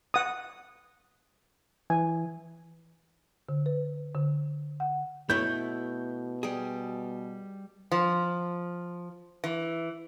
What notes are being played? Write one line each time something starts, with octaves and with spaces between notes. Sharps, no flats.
F#5 D#6
E3 G#5
D3
B4
D3
F#5
B2 A3 E4 C#5 G6
G3 G#4
F3
E3